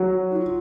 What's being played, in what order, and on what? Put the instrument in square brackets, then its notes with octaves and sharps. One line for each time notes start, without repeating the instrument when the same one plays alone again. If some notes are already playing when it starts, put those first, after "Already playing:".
Already playing: [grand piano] F#3
[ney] D#4
F4